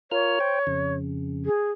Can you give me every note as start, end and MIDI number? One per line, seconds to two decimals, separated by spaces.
0.11 0.39 65
0.11 0.39 70
0.11 0.93 73
0.11 0.39 89
0.40 0.59 72
0.40 0.59 79
0.67 1.49 41
0.67 1.49 49
1.45 1.71 68